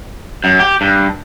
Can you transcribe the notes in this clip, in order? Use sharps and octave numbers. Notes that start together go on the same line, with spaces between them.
F#2
G4
G2